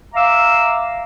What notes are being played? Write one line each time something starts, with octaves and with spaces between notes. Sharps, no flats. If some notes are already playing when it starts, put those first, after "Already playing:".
E5 F5 A#5 D6 E6